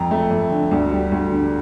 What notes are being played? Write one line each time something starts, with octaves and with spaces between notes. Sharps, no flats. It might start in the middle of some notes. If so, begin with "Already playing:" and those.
Already playing: F2 A#5
A3
F2
D3
D2
G3
D2
D3